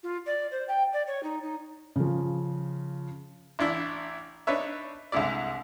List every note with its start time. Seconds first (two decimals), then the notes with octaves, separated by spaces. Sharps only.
0.03 F4
0.25 D5
0.51 C5
0.68 G5
0.92 D5
1.06 C#5
1.23 D#4
1.42 D#4
1.96 C#3 F3
3.59 A1 D4 E4
4.47 D4 D#4 B4 C#5 E5
5.12 C2 D3 G#3 E4 D5